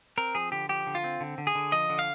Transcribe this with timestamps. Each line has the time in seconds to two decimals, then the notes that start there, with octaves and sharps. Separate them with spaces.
0.18 C4 A#4
0.35 F3 G#4
0.52 D3 G4
0.69 F3 G4
0.87 D3
0.95 F4
1.04 C4
1.21 D3
1.38 D3
1.47 G#4
1.55 D3
1.72 F3 D#5
1.90 D3
1.99 F5